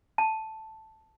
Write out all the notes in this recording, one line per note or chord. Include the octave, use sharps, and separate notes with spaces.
A5